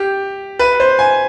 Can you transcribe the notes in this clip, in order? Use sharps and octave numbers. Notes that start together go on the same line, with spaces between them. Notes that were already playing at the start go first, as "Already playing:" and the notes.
Already playing: G4
B4
C5
G#5